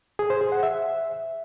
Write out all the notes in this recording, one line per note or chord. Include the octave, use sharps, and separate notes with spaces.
G#4
C5
G#4
F#5
E5